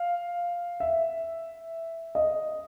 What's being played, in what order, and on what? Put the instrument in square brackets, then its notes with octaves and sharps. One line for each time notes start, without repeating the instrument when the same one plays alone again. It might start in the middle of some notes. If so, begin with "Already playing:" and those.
Already playing: [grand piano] F5
E5
D#5